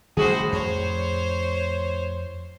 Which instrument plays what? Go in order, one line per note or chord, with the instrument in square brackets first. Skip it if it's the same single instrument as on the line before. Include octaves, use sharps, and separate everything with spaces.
[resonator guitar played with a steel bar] A2 G#4 [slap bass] D#3 G3 C#4 [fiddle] F#4 C5
[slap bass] F2 [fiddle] C5 C#5